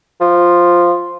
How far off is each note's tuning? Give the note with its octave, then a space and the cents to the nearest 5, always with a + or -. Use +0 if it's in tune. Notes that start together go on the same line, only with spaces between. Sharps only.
F3 +0